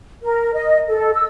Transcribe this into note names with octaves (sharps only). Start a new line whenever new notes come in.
A#4
D#5
A4
E6